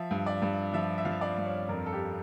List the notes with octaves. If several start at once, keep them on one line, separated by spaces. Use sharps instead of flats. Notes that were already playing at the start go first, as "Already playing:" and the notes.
Already playing: F3 E5
G2
D5
G2
F3 E5
E5
F3 F5
E5
D5
G2
C#5
F2 A#4
A4
G4